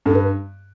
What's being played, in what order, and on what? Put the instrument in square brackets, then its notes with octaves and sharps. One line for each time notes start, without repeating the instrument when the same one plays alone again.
[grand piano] G2 [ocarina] A4
[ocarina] B4